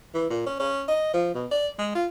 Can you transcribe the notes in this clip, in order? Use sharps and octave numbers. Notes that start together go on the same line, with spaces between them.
E3
A#2
C#4
C#4
D#5
F3
B2
D5
G#3
F4